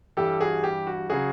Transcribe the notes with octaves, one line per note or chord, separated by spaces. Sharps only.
G2 E3 G3 G4 A4
F#4 G#4
G4
F#4
C#3 F#3 F#4 G#4